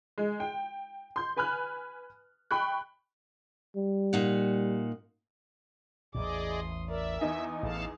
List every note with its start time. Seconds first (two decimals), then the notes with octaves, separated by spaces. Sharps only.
0.18 G#3
0.40 G5
1.16 C6 G6
1.37 B4 G#5 B5 F6 F#6
2.51 G5 B5 C#6 F#6
3.76 G3
4.13 A#2 D#4 F#5
6.15 A1 E2 A2 G#4 D5 D#5 D6
6.53 C6 D#6
6.89 A#4 D5 E5
7.21 E2 D#4 G#5
7.63 A1 G#4 A4 F5 A5